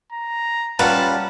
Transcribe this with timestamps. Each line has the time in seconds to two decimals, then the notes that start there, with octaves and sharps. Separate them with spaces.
0.12 A#5
0.79 G3 C#4 F4 B4 F#5 A5 A#5